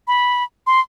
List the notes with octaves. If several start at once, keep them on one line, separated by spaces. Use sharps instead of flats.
B5
C6